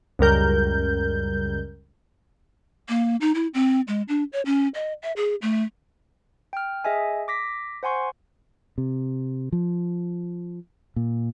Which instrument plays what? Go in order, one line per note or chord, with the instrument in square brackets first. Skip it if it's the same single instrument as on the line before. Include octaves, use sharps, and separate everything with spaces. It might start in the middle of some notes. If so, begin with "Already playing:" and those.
[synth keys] C#2 F#2 G3 A#4 G6
[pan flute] A#3
D#4
E4
C4
G#3
D4
C#5
C#4
D#5
E5
G#4
A3
[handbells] G5 F6
G#4 D#5 E5 G#5
D6 A#6 B6
C5 F#5 G#5 C6 C#6
[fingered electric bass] C3
F3
A#2